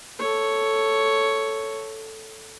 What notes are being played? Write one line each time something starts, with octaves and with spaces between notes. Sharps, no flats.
A4 C#5